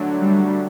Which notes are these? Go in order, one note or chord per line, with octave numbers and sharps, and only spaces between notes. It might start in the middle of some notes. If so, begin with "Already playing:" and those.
Already playing: D3 F#3 A3 D4
G3